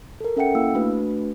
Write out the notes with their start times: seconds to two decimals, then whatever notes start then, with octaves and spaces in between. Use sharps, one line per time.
0.21 A4 A#4
0.36 C#4 A4 E5 F#5 G5 C#7
0.55 A#3 E4 F5 E6
0.75 A3 D4 F#4 B4